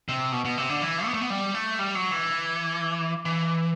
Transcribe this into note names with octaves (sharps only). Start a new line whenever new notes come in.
C3
B2
B2
C3
D3
E3
B3
A3
B3
G3
A3
G3
F#3
E3
E3